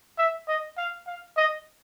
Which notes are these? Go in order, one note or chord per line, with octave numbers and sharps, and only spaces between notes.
E5
D#5
F5
F5
D#5